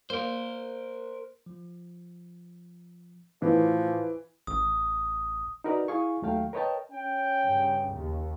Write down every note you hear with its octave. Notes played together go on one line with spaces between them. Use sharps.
A#3 A#4 C5
F3
A2 E3 F3
A1 D#6
D#4 F#4 A#4 B4 D5
E4 G#4 F5 G#5 C#6
D#2 F#3 A3 F5 G5
A#4 B4 C#5 D#5 G5 A5
C#4 G5
G2 C#3
D#2